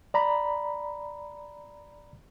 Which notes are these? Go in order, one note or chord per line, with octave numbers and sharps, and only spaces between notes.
D5 A#5 B5